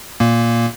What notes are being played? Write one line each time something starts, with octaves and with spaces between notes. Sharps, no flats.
A#2 A#3